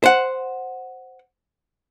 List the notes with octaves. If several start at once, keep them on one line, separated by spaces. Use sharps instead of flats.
C5 F#5